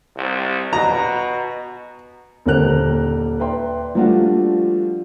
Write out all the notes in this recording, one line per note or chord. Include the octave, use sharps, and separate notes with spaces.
C2
B2 A#5
D#1 D3 A#4 C5 F#6 F7
B4 D5 E5 G5 C6
F3 G3 A3 D4 F4 F#4